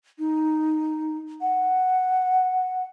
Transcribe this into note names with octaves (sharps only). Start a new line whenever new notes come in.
D#4
F#5